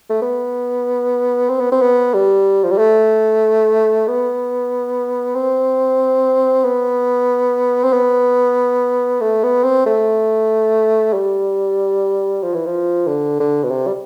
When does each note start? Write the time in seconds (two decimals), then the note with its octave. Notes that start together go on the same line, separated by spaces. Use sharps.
0.10 A3
0.22 B3
1.50 C4
1.60 B3
1.72 C4
1.82 B3
2.14 G3
2.64 F3
2.72 G3
2.78 A3
4.08 B3
5.35 C4
6.65 B3
7.84 C4
7.93 B3
9.21 A3
9.44 B3
9.64 C4
9.86 A3
11.14 G3
12.43 F3
12.54 E3
12.66 F3
13.07 D3
13.40 D3
13.64 B2
13.71 C3
13.87 G3